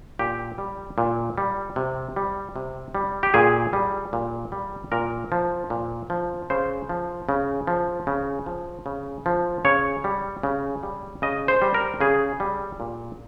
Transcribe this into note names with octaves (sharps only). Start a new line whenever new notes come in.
A#2 G4
G3
A#2
G3
C3
G3
C3
G3
G4
A#2 G#4
G3
A#2
G3
A#2 A#4
F3
A#2
F3
C#3 C5
F3
C#3
F3
C#3
F3
C#3
F3
C#3 C#5
G3
C#3
G3
C#3 D#5
C5
G3
A#4
C#3 G#4
G3
A#2